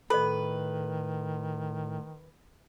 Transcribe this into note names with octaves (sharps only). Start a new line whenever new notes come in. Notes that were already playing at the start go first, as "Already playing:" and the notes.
A2 D#3 A4 B4 D#5